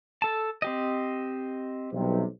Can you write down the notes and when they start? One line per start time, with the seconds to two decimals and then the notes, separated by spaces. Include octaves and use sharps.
0.22 A4 A5
0.62 C4 G4 D#5
1.93 B1 G2 C3